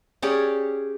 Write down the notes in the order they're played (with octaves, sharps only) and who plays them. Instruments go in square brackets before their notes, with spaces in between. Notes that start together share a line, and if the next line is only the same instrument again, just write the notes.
[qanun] C#4 G4 G#4 D5